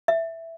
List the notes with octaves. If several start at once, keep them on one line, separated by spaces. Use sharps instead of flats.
E5